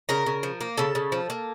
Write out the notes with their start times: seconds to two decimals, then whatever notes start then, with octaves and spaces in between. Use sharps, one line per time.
0.09 C#3 A#4 A#5
0.26 C#3
0.43 F3
0.61 A#3
0.77 C#3 A4 A5
0.95 C#3
1.12 F3
1.30 A#3